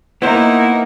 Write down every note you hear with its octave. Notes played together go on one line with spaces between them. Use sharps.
A#3 B3 D#4 E4 C5